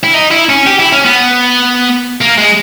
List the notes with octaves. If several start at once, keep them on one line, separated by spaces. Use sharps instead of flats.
E4
D#4
E4
C#4
G4
E4
C#4
B3
A#3
G#3